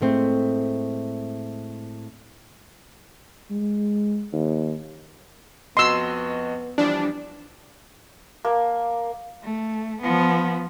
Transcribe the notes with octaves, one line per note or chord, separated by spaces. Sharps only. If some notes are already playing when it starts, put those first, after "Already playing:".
A2 G#3 A3 C4
G#3
D#2
F2 B3 F#4 D#5 C6 E6
E3 F3 G3 D4
A#3
A3
F3 B3